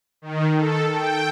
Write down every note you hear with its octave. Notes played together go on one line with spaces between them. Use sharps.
D#3
A4
G5